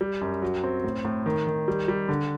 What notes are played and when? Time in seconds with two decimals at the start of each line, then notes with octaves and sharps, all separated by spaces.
0.01 G3
0.21 F#2
0.42 F#3
0.64 C4
0.84 A2
1.05 A2
1.26 D#3
1.47 D#3
1.68 G3
1.88 G3
2.09 D3